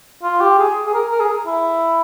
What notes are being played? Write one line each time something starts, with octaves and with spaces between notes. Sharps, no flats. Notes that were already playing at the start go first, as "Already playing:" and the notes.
F4
G4
G#4
G#4
A#4
A#4
G#4
E4